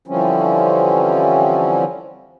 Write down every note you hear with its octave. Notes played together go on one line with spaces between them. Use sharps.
D3 E3 F3 G3 C4 C#4